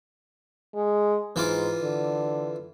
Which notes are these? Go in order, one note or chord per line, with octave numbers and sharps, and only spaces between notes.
G#3
G#2 E3 F4 D6
D3